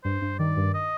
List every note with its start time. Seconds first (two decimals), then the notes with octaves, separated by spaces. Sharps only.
0.04 G2 C5
0.22 G2
0.39 D#3 D5
0.57 G2
0.74 D#5